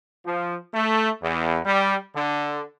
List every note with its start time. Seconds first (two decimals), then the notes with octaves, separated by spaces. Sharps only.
0.26 F3
0.74 A3
1.23 E2
1.65 G3
2.16 D3